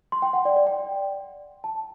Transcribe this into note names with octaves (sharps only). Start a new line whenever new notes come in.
C6
G5
F#5
D5
D5
G5
A5